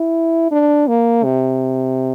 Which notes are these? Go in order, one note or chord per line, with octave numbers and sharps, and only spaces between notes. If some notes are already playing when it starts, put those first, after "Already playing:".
Already playing: E4
D4
A#3
C3